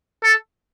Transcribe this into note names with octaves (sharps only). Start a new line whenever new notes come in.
A4